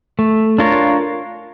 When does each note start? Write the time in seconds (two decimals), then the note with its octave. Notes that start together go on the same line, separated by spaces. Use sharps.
0.19 A3
0.58 D4 F4 A#4 C#5